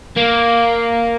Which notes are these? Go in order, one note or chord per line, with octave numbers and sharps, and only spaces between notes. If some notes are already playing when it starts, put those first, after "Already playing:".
A#3